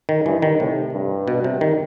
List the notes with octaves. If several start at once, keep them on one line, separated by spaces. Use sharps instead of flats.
D#3
G2 E3
D#3
A2 C3
G2
B2
C3
D#3